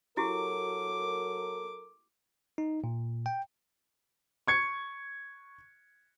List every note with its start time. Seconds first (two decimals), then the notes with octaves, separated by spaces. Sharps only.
0.17 F#3 E4 F#4 G4 A4 A#4 D6
2.58 D#4
2.84 A#2
3.26 G5
4.47 C#6 G#6 C#7